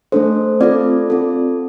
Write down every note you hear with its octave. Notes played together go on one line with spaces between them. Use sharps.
A3 D4 A4 C5
C4 F4 A4 D5
C4 F4 A4